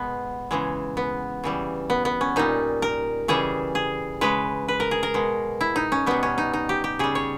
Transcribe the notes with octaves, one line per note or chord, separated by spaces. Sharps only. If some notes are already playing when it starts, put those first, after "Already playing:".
Already playing: B2 G#3 B3
C#3 E3 G#3
B3
C#3 E3 G3
B3
B3
C#4
A#2 G3 D#4
A#4
C#3 E3 G3 G#4
G#4
C#3 G#3 B4
B4
A#4
G#4
A#4
B2 G#3
E4
D#4
C#4
B2 G3 B3
C#4
D#4
D#4
G4
G4
C#3 G3 G#4
C#5